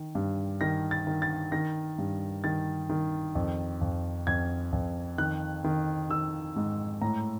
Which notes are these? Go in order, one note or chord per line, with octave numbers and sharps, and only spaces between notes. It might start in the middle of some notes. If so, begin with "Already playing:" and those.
Already playing: D#3
G2
D#3 A#6
A6
D#3
A6
D#3 A#6
G2
D#3 A6
D#3
F2
F2
F2 G#6
F2
D#3 F#6
D#3
D#3 E6
G#2
A2 A#5